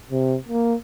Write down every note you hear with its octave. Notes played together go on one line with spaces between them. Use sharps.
C3
A#3